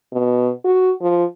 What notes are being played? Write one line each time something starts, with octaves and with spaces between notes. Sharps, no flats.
B2
F#4
F3